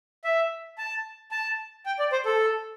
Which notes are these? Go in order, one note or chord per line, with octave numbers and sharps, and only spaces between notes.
E5
A5
A5
G5
D5
C5
A4